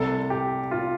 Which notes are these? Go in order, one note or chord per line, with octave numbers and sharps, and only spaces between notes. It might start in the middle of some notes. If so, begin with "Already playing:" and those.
Already playing: C2 C3 G3 A4
G4
F4